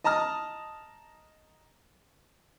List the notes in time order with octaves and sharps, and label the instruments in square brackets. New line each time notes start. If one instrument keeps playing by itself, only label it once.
[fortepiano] D#5 A5 A#5 D#6 F6